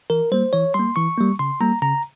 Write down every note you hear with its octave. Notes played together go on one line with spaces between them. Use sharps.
E3 A#4
G3 A#3 C5
E3 C#5
G3 A#3 C6
E3 C#6
G3 A#3
C#3 C6
G3 A#3 A#5
C#3 A#5